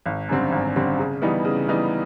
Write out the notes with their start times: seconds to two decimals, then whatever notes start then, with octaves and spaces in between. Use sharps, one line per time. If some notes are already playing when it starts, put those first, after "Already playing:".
0.06 G#1
0.29 F#2 D3 G3 C4
0.52 G#1
0.76 F#2 D3 G3 C4
0.99 C#3
1.22 E3 G3 B3 D#4
1.45 C#3
1.68 E3 G3 B3 D#4